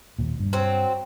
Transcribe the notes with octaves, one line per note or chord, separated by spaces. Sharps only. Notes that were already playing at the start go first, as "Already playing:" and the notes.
D#2 A#2
G2
F#3 C4